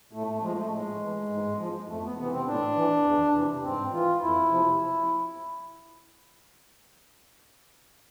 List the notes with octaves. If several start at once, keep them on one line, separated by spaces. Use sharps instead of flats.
A2 A3
A3
F3 G#3
A3
A2 G#3
E3
G#2
F3
F2 A3
B3
C3 E3 B3
C4
A2 D4
E3
E2
C3 E3
G#2 C4
E3 F4
F2 E4
C3 F3